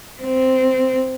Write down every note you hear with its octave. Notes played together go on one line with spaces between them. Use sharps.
C4